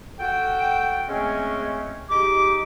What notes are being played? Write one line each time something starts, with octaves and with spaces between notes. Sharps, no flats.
F#4 A4 G5
G#3 A3 C4 C#4
D#4 G4 G#4 D6